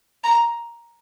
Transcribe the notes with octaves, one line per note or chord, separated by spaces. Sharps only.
A#5